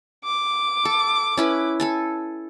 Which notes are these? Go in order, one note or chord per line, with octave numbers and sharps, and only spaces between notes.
D6
A4
C#4 E4 B4
A4 G#5 A5